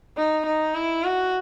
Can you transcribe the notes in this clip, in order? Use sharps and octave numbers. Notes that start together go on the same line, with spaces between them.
D#4
D#4
E4
F#4